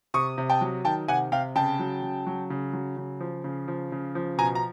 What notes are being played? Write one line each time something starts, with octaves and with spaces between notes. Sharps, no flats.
C3 C#6 D#6
C3
G5 A5
F#3
D#3 G5 A5
C3 F#5 G#5
C3 F5 G5
C#3 G5 A5
F#3
C#3
F#3
C#3
F#3
C#3
F3
C#3
F3
C#3
F3
B2 G#5 A#5
A#5